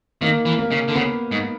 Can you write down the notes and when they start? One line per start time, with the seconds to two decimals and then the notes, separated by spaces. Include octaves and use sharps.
0.21 D#3 A#3
0.45 E3
0.58 A#3
0.71 C#3
0.88 D3
0.95 C#3 B3
1.32 G#2